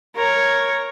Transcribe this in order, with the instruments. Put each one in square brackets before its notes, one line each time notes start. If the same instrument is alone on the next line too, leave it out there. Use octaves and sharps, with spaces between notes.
[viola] A#4 C#5